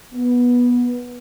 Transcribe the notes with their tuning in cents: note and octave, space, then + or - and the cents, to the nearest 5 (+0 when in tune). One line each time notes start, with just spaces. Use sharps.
B3 -15